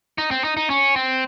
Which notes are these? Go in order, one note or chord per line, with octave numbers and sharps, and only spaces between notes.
D#4
C4
D#4
D#4
C#4
C4